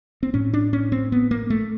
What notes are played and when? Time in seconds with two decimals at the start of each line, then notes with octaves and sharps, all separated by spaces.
0.23 C4
0.34 A2 C#4
0.54 D4
0.73 C#4
0.92 C4
1.12 B3
1.31 A#3
1.50 A3